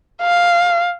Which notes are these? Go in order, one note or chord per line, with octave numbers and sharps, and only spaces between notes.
F5